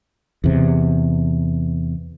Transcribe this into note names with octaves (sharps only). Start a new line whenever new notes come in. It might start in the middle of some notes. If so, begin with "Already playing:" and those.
E2 C3